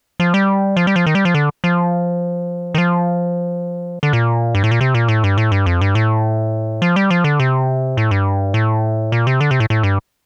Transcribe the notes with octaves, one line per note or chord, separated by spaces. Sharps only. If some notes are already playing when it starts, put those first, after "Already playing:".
F3
G3
F3
G3
F3
D#3
G3
F3
D3
F3
D#3
F3
D3
A#2
G2
A2
A#2
C3
A#2
A2
G2
A2
G2
F2
G2
A2
F3
G3
F3
D3
C3
A2
G2
A2
A#2
C3
D3
C3
A2
A2
G2